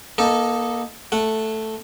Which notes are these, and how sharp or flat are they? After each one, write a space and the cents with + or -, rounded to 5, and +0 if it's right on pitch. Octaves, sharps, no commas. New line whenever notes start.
A#3 +30 D#4 +10 A4 +0
A3 +0 F#5 -5